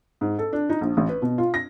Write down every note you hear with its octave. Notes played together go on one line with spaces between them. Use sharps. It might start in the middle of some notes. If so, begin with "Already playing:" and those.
G#2
A4
D4
D#4
A#1
A1
B4
B2
F4
A#6